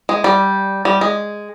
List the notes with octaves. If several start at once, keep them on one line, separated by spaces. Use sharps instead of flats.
G#3
G3
G3
G#3